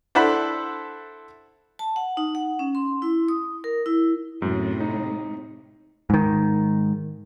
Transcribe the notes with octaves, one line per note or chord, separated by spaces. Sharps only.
D4 E4 A4 C5 F#5 B5
A5
F#5
D#4
F#5
C#4
C6
E4
D#6
A#4
E4
F#2 A2 C3
D#4
G#2 D#3